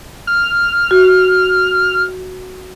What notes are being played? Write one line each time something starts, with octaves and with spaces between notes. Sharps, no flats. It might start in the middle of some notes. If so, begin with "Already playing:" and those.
F6
F#4